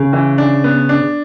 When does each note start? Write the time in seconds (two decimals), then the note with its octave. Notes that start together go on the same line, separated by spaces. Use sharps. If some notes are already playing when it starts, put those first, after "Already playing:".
Already playing: C#3
0.13 E3
0.38 D4
0.64 B3
0.89 D4